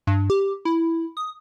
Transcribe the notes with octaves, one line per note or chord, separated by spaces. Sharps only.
G2
G4
E4
D#6